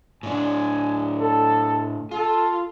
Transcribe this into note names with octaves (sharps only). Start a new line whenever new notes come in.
A2 D4 G#5
A4
F4 A4